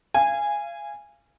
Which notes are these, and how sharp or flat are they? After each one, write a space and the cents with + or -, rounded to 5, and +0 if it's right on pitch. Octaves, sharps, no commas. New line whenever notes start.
F5 -30 G#5 -15